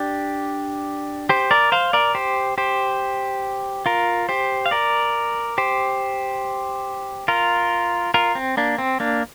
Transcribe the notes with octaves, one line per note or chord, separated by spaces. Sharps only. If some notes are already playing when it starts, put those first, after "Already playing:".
Already playing: D4 G4
G4 C5
A#4 D5
C5 F5
A#4 D5
G4 C5
G4 C5
F4 A#4
G4 C5
F5
A#4 D5
G4 C5
F4 A#4
F4 A#4
C4
A#3 D4
C4
A#3 D4